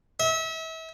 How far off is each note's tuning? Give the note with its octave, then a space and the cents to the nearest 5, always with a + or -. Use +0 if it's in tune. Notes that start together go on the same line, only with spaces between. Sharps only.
E5 -35